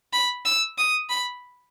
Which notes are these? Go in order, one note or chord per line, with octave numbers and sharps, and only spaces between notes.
B5
E6
D#6
B5